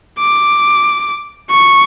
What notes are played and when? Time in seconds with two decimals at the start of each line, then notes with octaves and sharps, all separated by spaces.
0.19 D6
1.50 C#6